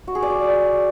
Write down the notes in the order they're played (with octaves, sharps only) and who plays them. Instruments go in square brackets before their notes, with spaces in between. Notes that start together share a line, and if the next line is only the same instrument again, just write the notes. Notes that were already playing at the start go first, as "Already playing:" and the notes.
[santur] F#4
G#4
D5
G#4